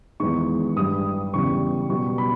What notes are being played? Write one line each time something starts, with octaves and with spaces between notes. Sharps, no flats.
E2 D#3 G#3 C#6
G2 G3 D#6
E2 C#3 G3 C#6
B2 G3 C#6
B5